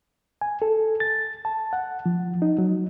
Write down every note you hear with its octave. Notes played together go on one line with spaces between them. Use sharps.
G#5
A4
A6
A5
F#5
F3
D#4
F#3